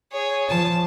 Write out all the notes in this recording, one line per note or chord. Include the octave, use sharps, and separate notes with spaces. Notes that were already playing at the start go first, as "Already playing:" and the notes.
G#4 C#5
F3 A5